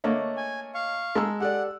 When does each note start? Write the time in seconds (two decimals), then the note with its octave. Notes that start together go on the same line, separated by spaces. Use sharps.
0.04 D3 A3 A#3 C#5 D#5 A5
0.37 G#5
0.75 F5 C#6
1.15 G#3 A5 A#5 E6
1.40 G4 A4 D5 F#5